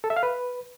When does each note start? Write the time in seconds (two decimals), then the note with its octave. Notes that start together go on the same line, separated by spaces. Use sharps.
0.04 A4
0.10 E5
0.17 F5
0.23 B4